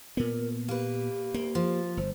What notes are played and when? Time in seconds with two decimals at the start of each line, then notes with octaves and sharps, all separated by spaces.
0.17 A#2 B3 A#4
0.68 A#3 G4 B4
1.34 D2 A#3
1.55 F3
1.97 G1 C5